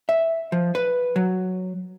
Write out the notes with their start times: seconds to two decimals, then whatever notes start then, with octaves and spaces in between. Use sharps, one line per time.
0.09 E5
0.52 F3
0.75 B4
1.16 F#3